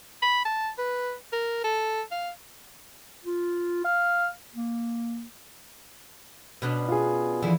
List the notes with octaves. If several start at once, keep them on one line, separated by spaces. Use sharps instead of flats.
B5
A5
B4
A#4
A4
F5
F4
F5
A#3
B2 C#4 D4 F6 F#6
F4 G#4
D3 E3 F3 E4